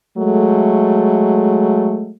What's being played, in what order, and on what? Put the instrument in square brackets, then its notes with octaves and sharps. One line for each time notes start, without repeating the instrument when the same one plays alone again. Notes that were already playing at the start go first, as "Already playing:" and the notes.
[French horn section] F#3 G#3 A3